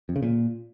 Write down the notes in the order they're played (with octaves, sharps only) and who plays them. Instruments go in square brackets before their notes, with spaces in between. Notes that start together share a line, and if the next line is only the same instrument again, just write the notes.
[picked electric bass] F2
C#3
A#2